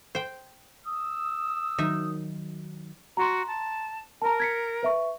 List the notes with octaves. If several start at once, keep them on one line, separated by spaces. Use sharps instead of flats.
C5 G5
D#6 E6
D#3 F#3 D#4 E5
F#4 A#5 C6
A5
A#4 A5 A#5
G#6 B6 C#7
B4 E5 C#6